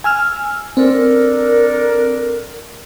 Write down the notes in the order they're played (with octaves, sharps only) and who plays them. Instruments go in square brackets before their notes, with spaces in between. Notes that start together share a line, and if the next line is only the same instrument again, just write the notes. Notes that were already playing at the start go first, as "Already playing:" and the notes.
[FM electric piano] G#5 E6 F6
[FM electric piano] C4 [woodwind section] D4 A4 A#4